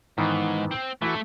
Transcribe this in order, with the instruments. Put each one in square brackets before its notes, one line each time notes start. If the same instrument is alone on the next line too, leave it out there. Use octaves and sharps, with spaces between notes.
[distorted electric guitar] G#2 [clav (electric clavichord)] D#3 E3 B3
[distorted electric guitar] C4
[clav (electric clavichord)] E3 E4 F#4 [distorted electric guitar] A3